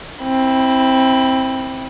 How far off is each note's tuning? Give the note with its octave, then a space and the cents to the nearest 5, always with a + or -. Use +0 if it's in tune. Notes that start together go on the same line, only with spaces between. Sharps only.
C4 +10 E4 -20 B5 +25